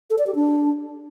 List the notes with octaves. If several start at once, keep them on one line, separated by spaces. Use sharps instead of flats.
A4
D5
G4
D4